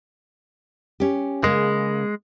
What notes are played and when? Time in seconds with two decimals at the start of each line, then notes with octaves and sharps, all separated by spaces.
1.00 C#4 G4
1.44 C#3 G#3 A#3